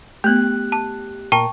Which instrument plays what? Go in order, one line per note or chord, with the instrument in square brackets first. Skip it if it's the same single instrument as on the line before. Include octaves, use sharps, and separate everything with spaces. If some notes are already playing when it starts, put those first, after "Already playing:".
[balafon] A3 B3 [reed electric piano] G4 F#6
[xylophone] A5
[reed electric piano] A#2 A#4 [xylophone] G5 A5 C#6